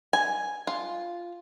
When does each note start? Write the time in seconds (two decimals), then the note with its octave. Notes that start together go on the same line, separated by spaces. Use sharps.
0.13 G#5
0.67 F4